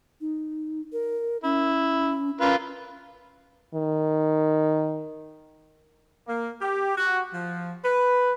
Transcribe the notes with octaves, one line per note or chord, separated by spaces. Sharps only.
D#4
A#4
C#4 E4
C#4 F4 A#4 B4
D#3
A#3
G4
F#4
F3
B4